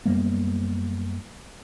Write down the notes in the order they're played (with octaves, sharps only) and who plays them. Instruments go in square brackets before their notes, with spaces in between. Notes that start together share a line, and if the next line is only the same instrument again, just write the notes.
[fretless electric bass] F#2 G3 A#3 B3